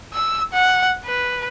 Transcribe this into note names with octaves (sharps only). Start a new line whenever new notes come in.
E6
F#5
B4